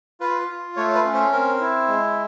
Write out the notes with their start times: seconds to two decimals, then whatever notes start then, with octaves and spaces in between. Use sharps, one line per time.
0.20 F4 B4
0.49 F4
0.76 A3 C#5
0.95 B4
1.04 C#4
1.14 C5
1.32 C4 A#4
1.60 E4
1.88 G#3